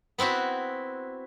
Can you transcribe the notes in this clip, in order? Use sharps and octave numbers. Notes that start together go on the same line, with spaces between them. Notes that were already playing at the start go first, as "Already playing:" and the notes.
B3 C4 E4 F#4